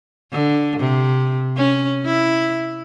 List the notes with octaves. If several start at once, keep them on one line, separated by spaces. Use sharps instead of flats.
D3
C3
C#4
E4